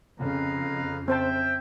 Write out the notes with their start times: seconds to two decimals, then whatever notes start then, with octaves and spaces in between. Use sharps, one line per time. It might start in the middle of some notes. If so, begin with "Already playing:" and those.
0.19 F2 C#3 B4 F5 A#5
1.08 C4 C5 E5 G5 A5